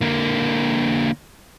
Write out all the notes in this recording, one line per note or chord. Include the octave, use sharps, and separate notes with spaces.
D3 A#3